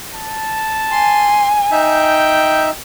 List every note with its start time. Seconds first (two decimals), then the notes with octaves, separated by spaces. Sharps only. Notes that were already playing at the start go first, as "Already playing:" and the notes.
0.15 A5
0.91 G#5 C6
1.71 D#4 E5 G5